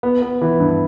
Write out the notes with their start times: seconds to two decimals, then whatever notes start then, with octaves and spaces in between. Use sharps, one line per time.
0.03 B3
0.22 B3
0.41 E3
0.60 G2